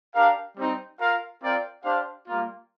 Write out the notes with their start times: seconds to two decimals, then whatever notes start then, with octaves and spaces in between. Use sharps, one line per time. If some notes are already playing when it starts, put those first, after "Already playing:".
0.14 D4 G4 A#4 F5
0.56 G3 C4 D#4
0.99 F4 A#4 F5
1.41 C4 F4 A#4 D5 G5
1.83 D4 G4 C5 F5
2.26 G3 A#3 F4